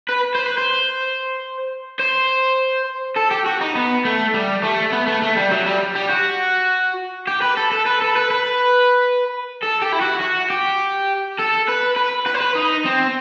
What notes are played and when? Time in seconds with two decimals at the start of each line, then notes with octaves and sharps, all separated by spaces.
0.09 B4
0.35 C5
0.46 B4
0.58 C5
1.99 C5
3.17 A4
3.31 G4
3.46 F#4
3.61 D#4
3.75 B3
4.05 A3
4.34 G3
4.63 A3
4.93 B3
5.07 A3
5.23 A3
5.37 G3
5.51 F#3
5.66 G3
5.96 G3
6.10 F#4
7.28 G4
7.42 B4
7.57 A4
7.71 A4
7.86 B4
8.01 A4
8.15 B4
8.31 B4
9.63 A4
9.82 G4
9.93 E4
10.01 F#4
10.21 F#4
10.50 G4
11.39 A4
11.68 B4
11.97 B4
12.26 B4
12.34 C5
12.41 B4
12.56 D#4
12.85 C4